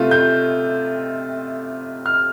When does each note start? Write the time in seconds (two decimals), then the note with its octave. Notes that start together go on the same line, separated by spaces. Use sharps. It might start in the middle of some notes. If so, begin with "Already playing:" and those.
Already playing: C3 A3 F4
0.11 G6
2.06 F6